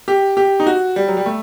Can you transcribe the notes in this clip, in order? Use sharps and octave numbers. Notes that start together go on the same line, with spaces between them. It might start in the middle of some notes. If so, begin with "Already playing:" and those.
G4
G4
D#4
F#4
G3
F#3
G3
A3